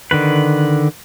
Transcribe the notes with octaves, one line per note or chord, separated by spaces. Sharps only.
D3 D#3 B4